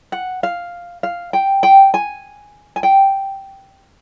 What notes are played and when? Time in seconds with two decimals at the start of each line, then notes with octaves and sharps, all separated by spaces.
0.12 F#5
0.43 F5
1.03 F5
1.33 G5
1.63 G5
1.94 G#5
2.76 G#5
2.83 G5